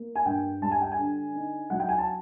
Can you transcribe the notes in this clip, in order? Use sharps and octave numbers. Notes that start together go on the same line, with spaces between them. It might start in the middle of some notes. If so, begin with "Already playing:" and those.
Already playing: A#3
G#5
G2 G5
G3 A5
G#5
G5
G#5
D3
D#4
F#3 F#5
G5
G#5
A5